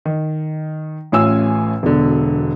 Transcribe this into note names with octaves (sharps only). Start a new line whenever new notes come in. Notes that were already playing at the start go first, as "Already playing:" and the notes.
D#3
A1 A2 C#4 F4 G#5 E6
E1 B2 D3